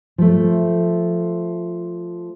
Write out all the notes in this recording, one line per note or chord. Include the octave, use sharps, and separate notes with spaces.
F3 A3